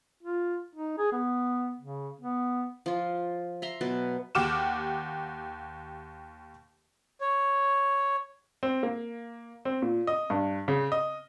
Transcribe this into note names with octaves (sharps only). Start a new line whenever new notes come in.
F4
D#4
G#4
B3
C#3
B3
F3 F4
E5 A#5 C6
B2 F#3 B4 A5
D#2 G4 F#5 D6 F6 E7
C#5
C4
A#3
C4
A#2
D#5
G2
C#3
D#5